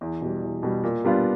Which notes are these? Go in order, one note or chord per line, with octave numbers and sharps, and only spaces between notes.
E2
B2 G3
E2
B2 G3
A#2
G3 B3 D4 F4